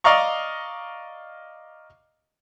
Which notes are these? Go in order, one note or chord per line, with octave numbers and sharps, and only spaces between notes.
D5 D#5 F5 A#5 C#6